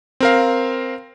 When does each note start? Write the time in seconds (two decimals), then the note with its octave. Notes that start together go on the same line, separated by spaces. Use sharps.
0.20 C4 A#4 F5